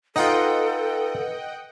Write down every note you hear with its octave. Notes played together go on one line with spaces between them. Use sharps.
D#4 F4 A4 B4 D#5 F#5 G5